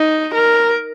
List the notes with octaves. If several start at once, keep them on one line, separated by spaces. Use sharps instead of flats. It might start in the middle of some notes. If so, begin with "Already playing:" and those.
Already playing: D#4
A#4